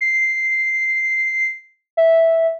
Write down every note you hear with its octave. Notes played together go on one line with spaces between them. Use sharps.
C7
E5